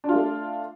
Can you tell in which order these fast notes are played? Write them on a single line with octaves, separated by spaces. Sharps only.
D4 F4 A3